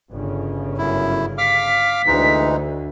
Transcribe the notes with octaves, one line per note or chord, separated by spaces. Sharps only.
G1 C#3
F#2 E4
F5 D6 F6 B6
D2 E3 G#3 D#4